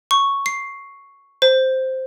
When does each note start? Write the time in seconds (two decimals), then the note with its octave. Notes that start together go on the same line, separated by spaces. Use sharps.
0.11 C#6
0.46 C7
1.42 C5